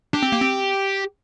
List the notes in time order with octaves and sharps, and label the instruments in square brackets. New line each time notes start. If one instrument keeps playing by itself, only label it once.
[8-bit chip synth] D4 [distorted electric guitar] G4
[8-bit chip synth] C4
A#3
C4